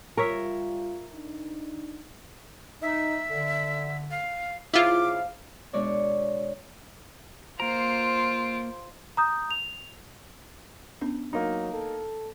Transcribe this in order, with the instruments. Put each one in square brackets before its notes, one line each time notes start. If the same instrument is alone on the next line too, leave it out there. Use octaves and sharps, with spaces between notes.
[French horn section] G3 F4 [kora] A#4 C#5 E5
[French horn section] D4 D#4
[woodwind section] D#4 [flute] E5
[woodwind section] D3
[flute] F5
[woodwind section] C#2 F3 F5 [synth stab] E4 F4 [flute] D6
[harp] B2 G#3 D4 C#5 D5 E5
[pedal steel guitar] A#3 A#5 [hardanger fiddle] F4 C5 [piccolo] D7
[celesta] A#5 D#6 G6
F7
[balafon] B3 C#4 D4
[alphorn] F#3 [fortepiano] A#3 D#4
[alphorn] A4